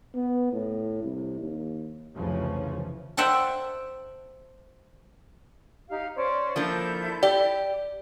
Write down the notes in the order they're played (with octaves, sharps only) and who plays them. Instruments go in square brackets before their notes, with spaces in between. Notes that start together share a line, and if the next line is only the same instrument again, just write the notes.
[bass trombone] B3
A2
C2
D#2
[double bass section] F1 C2 C#3 E3 F3 C#4
[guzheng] C5 E5 F#5 G5 A5
[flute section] D#4 G4 F5
C#4 C5 D5
[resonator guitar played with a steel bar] F3 A#3 D4 [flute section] E4 A4 G6
[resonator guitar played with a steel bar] G4 [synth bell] D5